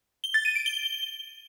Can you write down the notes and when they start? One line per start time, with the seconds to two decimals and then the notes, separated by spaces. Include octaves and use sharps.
0.24 G7
0.34 A6
0.45 D#7
0.55 D7
0.66 G7